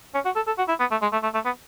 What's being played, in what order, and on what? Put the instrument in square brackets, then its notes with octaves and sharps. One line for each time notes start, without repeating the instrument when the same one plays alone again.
[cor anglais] C#4
F#4
A4
A4
F#4
E4
B3
A3
G#3
A3
A3
A3
B3